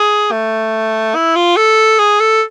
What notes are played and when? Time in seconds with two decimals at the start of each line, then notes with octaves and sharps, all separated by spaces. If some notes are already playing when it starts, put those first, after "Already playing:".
Already playing: G#4
0.32 A3
1.15 E4
1.36 F4
1.57 A4
1.99 G#4
2.20 A4